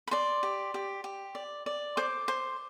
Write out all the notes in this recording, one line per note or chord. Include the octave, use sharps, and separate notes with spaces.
B5
D5 C6
G4
G4
G4
D5
D5
C5 D6
C5